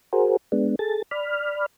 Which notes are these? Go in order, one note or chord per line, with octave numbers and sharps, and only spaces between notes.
F#4 G#4 A#4 C5
G#3 B3 D4
G#4 A4 A6
D5 B5 F6